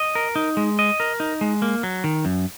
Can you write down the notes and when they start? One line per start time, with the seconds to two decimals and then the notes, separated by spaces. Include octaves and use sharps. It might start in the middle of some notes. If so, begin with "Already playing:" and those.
Already playing: D#5
0.15 A#4
0.36 D#4
0.57 G#3
0.79 D#5
1.00 A#4
1.20 D#4
1.41 G#3
1.62 A#3
1.83 F#3
2.04 D#3
2.25 F#2